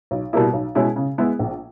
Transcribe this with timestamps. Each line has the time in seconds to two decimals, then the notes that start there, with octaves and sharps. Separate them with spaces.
0.11 B1
0.33 B2 G3 A#3 E4
0.53 B1
0.75 B2 G#3 C#4 E4
0.96 C#3
1.18 G#3 B3 E4
1.39 A#1